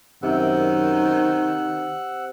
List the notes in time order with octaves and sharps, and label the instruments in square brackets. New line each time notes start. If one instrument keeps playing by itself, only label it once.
[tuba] F#2 [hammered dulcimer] C3 [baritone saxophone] D#3 [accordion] F#5 E6 F#6